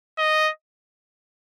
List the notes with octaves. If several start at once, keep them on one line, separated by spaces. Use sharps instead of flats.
D#5